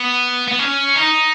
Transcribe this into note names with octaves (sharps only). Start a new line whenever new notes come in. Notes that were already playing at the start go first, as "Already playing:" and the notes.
Already playing: B3
B3
C#4
D#4